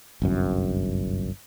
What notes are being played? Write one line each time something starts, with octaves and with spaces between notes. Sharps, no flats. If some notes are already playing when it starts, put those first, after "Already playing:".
G1 C2 F#2